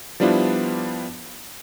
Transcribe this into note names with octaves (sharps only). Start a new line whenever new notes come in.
F3 G3 B3 D4 E4 F4